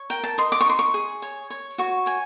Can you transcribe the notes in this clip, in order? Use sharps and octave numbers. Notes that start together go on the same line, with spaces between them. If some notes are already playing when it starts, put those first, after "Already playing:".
Already playing: C#5
A#4 G5
A5
D#5 C6
D6
C#6
D#4 C6
C#6
G#4
C#5
C#5
F#4 C#6
C#5 G#5